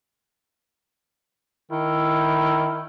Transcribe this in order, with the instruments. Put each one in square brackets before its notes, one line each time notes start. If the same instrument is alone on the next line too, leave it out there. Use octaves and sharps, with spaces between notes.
[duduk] D#3 [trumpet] E4